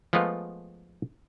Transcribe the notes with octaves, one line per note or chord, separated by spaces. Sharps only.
F3 G#3 A3 B3 F4